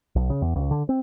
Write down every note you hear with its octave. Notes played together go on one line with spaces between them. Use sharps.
B1
C#3
E2
C#2
D3
C4